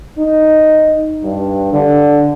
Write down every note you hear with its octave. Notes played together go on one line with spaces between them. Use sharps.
D#4
G2
D3